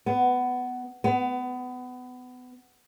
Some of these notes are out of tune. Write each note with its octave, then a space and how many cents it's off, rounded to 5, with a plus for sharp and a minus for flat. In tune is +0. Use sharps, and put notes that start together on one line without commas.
B3 +15
B3 +25